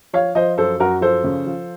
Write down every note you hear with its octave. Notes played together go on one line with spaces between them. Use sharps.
F3 C#5 F5
F3 C5 D#5
F#2 A4 C5
F#2 F#4 A#4
F3 A4 C5
C#3
F3